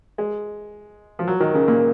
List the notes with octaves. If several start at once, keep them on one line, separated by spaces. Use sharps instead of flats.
G#3
F3
F#3
D#3
C#3
A#2